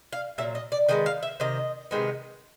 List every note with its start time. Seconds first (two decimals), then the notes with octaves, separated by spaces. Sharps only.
0.13 F5
0.38 A#2 F#3 E5
0.55 D#5
0.72 D5
0.89 D#3 G#3 B3 D#5
1.06 F5
1.23 E5
1.40 C3 D#3 D#5
1.91 C3 D#3 G#3 B3